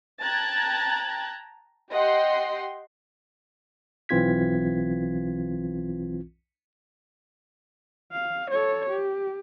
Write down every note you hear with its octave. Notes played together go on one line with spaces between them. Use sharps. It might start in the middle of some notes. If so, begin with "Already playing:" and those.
G5 A5 A#5 F#6 G#6 A6
G4 D#5 F#5 G5 C6
B1 E3 C4 F4 G#6 B6
F5
A4 C#5
G4